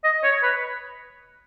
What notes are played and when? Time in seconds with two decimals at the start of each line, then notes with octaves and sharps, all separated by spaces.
0.04 D#5
0.24 C#5
0.43 B4